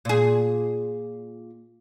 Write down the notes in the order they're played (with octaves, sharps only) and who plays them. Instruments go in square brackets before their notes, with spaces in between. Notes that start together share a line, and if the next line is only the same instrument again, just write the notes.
[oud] A#2 G#4